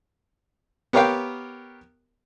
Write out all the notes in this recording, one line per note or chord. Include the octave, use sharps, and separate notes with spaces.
B3 G4 A#4 C#5 F5 G5